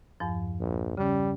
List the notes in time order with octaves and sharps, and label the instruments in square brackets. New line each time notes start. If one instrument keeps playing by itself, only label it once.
[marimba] E2 G2 F3
[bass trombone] A#1
[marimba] C#3 C#4 [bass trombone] G3